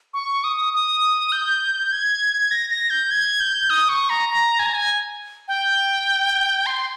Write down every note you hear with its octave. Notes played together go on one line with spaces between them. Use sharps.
C#6
D#6
D#6
G6
G#6
A#6
A#6
G6
G#6
G6
D#6
C#6
A#5
A#5
G#5
A#5
G#5
G5
C6